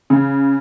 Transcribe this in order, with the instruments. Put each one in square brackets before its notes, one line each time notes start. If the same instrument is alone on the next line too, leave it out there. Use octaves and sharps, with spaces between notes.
[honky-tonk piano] C#3